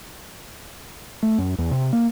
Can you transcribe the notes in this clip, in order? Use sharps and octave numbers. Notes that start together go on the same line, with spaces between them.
A3
F#2
E2
C3
A#3